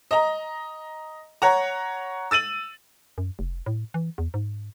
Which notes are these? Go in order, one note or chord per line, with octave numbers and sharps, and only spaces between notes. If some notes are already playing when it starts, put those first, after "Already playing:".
D#5 A#5
C#5 F#5 A#5
E6 A6 D#7 F#7
F#2
F1
A2
E3
E2
G#2